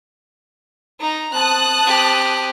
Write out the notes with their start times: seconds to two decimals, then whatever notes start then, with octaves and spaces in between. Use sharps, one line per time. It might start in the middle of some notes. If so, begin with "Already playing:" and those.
1.00 D#4 A#5
1.33 C4 A5 D#6 F#6
1.83 C4 G4